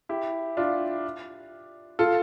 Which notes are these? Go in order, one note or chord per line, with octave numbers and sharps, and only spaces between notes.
E4 G4
D4 F4
F4 A4